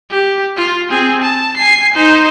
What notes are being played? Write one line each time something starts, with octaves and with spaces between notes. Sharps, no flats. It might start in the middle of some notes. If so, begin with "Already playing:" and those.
G4
F4
C4 G#4
A5
G#5 C7
D#4 C5